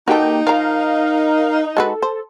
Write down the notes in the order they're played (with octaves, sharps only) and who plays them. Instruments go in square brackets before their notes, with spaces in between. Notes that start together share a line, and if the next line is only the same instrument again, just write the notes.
[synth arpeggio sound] A#3 G4 G5 [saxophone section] D#4 [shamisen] F#4 A4
[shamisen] F3 A#5 [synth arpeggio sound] A#4 F5
[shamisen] G#3 F#4 B4 [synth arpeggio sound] A4
[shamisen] C5